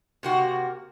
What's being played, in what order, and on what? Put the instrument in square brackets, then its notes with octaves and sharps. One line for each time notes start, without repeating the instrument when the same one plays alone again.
[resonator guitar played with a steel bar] C3 A#3 F#4